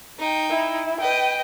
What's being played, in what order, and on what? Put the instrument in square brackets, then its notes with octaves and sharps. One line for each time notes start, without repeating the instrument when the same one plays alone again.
[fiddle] D#4 G5
[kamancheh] E4
[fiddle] B4 D#5 [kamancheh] G5